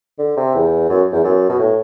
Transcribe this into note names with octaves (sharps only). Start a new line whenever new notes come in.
D3
C3
E2
F#2
E2
F#2
B2
A2